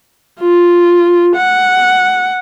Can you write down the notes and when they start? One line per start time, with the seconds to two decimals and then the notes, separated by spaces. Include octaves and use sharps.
0.40 F4
1.36 F#5